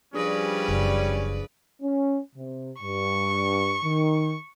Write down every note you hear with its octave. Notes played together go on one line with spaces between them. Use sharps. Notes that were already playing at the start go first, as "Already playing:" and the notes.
F3 G3 C#4 D4 G#4 B4 D5 A#6
F#1
C#4
C3
G2 C#6
D#3